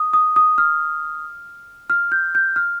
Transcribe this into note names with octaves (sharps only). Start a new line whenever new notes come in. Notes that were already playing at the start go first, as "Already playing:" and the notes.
Already playing: D#6
D#6
D#6
F6
F6
G6
G6
F6